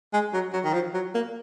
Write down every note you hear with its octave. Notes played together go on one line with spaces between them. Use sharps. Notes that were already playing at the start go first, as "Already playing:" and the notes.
G#3
F#3
F#3
D#3
F3
F#3
A#3